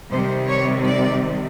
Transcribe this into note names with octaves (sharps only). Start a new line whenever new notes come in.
C3 D#3 G3 C5
C#5
D5